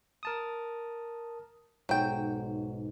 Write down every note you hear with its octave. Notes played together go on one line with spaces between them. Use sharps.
A#4 A5 D#6
B1 G#2 F#3 G5